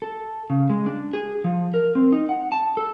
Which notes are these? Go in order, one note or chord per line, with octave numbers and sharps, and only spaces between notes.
A4
C#3
G#3
D4
G#4
F3
A#4
C4
D#4
F#5
A5
A4